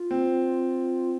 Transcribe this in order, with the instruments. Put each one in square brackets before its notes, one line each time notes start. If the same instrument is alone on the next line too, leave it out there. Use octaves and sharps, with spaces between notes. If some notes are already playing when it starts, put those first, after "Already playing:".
Already playing: [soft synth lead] F4
[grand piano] C4